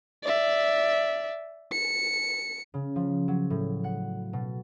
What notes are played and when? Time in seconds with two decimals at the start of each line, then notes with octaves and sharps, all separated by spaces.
0.24 D5 E5
1.72 C#7
2.74 C#3
2.96 F3
3.28 F#3
3.50 A2
3.84 F#5
4.33 B2